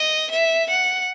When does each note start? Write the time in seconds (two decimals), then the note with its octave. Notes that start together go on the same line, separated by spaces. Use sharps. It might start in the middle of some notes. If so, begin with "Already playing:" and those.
Already playing: D#5
0.31 E5
0.69 F#5